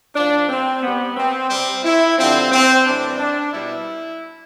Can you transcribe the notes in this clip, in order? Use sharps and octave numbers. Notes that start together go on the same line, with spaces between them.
A2 F3 D4
C4
C3 G3 B3
C4
C3 G3 C4
E4
G2 D3 F3 C4
C4
A2 E3 G3 D4
D4
B2 G3 E4